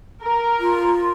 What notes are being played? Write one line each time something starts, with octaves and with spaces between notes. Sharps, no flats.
A#4
F4